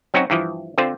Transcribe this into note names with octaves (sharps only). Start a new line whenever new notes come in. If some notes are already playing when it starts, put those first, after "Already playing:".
F#3 C4 C#4 D#4 F#4
G2 E3 F3
D3 C4 F4 C5